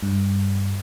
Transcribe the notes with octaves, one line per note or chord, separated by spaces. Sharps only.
G2